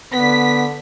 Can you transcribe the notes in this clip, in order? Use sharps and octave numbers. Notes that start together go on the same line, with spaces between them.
D3 B3 B6